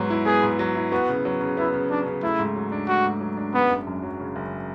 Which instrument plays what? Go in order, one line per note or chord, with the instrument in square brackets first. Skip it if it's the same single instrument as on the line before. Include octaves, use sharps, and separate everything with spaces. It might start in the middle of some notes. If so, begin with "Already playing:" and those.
Already playing: [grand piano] G#2 F#3 B3
E4
[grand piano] B3 [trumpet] G#4
[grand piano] G#2
F#3
E4
[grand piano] B3 [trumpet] F#4
[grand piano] C#3
F#3
C#3
[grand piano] B3 [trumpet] E4
[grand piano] C#3
[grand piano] F#3 [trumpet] D4
[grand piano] C#3
[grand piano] A3 [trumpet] E4
[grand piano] G#2
F#3
D4
[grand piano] A3 [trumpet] F#4
[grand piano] G#2
F#3
D4
[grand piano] C#3 [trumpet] B3
[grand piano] F#1
F#2
F#3
C#3
F#1